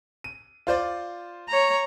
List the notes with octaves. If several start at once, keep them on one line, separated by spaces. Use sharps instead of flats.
D#7
F4 C5 D5
C#5 A#5